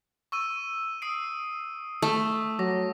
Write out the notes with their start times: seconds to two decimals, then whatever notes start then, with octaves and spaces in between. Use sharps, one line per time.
0.32 C#6 E6 D#7
1.02 D#6 C7 D7
2.02 A3
2.59 F#3 D6 A#6